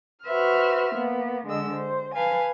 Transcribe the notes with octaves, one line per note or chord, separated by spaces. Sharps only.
F#4 B4 C5 E5 F6
A#3 B3
D3 G#3 D#5 E6
C5
B4 F5 G#5 A5